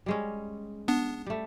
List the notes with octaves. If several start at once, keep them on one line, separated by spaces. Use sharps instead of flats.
G3 G#3 C#4
B3 D4
G3 A3